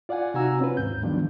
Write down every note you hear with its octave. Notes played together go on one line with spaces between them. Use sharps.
F4 D5 F5 F#5 G#5
C3 D#4 F#4 G#5 A#5 E6
C4 C#4 F4 B4
D#2 G#2 G6
D#3 F3 G3 B3 D4 F4